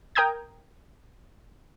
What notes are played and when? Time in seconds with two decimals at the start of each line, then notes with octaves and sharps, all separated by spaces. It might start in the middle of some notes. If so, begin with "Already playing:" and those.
0.15 A#4 G5 A#5 D#6 G6 G#6